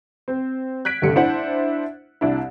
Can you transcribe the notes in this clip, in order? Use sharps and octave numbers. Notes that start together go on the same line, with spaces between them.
C4
F#6 G#6 B6 D7
F1 G2 D3 G4 C#7
D4 E4 C5 E5 F#5
C2 D4 E4